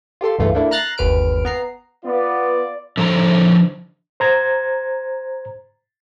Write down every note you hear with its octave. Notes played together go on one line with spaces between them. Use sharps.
F4 G4 A4 C6
C#2 G2 E3 A3 F4
A3 A#3 D4 E4
A#5 F6 F#6 A6 A#6 C7
G1 D#2 B4 F6 D7
B3 A#5 C7
B3 F4 D5
D3 F3 A4 A#5
C5 A#5 G#6